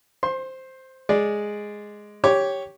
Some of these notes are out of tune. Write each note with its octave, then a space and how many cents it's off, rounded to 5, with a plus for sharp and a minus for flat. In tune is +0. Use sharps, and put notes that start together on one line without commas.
C5 +0 C6 +30
G#3 +0 D5 +0
G4 +0 C#5 +0 D6 -10